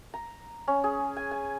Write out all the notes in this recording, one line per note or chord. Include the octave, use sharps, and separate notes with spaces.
A#5
C#4
G#4
G#5
G#5